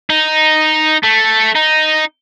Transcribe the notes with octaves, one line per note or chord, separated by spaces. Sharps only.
D#4
A3
D#4